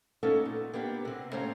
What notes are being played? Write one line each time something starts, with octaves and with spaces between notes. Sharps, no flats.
A#3 B3 C#4 D#4 A4
A#2
A#3 B3 D4 G4
C3 C4
A2 A#3 C#4 C5 A#5